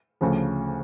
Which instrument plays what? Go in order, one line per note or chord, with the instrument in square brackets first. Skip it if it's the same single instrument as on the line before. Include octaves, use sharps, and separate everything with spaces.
[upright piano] D2 C#3 F3